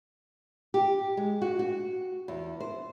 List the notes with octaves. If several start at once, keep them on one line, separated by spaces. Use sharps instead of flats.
G4
G#3
F#4
F#4
E2
C5